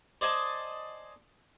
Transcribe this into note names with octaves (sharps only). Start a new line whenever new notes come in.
C5 D5 D#5 G#5 A5